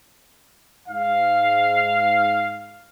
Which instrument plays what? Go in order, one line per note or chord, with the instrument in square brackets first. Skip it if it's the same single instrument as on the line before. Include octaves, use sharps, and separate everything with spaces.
[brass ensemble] G#2 F5